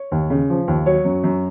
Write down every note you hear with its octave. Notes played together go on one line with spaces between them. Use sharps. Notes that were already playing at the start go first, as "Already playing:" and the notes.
Already playing: C#5
D#2
C#3
F3
D#2
F#3 C#5
F#2
F#2